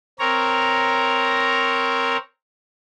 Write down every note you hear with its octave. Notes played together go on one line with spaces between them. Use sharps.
C4 A#4 C#5 A#5